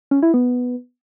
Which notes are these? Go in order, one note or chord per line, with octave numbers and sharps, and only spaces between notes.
C#4
E4
B3